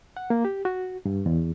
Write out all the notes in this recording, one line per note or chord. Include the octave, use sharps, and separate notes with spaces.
F#5
A#3
G4
F#4
G2
E2